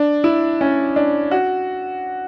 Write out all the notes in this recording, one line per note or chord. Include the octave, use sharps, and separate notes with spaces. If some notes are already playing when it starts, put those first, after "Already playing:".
Already playing: D4
E4
C#4
D4
F#4